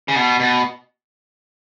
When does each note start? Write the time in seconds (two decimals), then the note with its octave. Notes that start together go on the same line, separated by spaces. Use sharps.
0.08 C#3
0.15 B2
0.40 B2